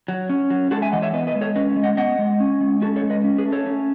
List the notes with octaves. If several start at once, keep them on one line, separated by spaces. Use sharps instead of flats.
F#3
C#4
F#3
G#3 F#4 A4
E5 G#5
E3 D#5 F#5
C#5 E5
B3 B4 D#5
B4 D#5
G#3
A4 C#5
C#4 B4 D#5
G#3
D#5 F#5
B3 D#5 F#5
G#3
C#4
G#3
C#4 F#4 A4
A4 C#5
G#3
B4 D#5
C#4
G#4 B4
A3
A4 C#5
C#4